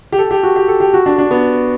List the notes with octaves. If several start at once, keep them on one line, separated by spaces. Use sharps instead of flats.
G4
A4
G4
F#4
G4
A4
G4
F#4
D4
D4
B3